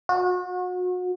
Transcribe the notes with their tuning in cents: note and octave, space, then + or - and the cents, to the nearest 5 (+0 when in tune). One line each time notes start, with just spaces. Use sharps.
F#4 -35